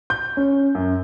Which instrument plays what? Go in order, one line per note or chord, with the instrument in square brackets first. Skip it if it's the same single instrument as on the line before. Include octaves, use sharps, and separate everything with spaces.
[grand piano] G6
C#4
F#2